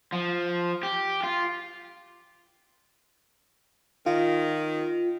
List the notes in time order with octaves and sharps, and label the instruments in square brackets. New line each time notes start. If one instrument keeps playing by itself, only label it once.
[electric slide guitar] F3
G4
F4
[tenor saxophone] D#3 [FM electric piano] F4